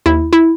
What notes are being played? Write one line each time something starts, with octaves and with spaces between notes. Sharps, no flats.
D#2 E4
E4